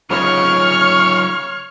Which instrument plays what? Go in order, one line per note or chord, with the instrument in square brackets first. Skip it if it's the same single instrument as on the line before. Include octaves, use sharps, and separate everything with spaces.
[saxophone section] C#3 [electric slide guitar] F#3 D#4 F4 [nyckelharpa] C#5 [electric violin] C#6 F6